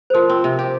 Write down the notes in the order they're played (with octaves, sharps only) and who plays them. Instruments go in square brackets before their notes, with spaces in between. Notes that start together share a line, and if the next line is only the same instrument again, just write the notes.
[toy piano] C5
[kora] F3 [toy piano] A#4
[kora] C4
C3
G4